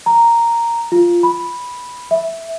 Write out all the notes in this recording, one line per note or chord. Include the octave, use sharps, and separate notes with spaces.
A#5
F4
B5
E5